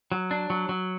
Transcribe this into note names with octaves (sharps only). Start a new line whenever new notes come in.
F#3
D4
F#3
F#3